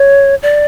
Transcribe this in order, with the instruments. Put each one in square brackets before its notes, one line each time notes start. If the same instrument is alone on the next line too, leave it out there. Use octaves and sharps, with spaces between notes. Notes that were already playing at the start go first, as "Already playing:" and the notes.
Already playing: [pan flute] C#5
D5